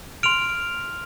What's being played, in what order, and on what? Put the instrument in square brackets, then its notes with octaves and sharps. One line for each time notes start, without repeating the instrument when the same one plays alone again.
[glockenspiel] C6 F6 D7 F7